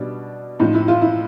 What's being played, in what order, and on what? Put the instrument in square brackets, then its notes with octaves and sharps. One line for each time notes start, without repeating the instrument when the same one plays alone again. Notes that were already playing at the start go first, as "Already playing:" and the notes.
Already playing: [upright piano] B2 G3 D4
A2 F3 D#4
E4
F4
E4